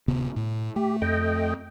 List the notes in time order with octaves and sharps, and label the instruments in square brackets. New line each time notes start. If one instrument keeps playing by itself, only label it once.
[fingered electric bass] D1 C3 B3
A2
[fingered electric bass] A3 [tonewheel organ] G4
[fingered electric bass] F2 [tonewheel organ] A3 D#5 G5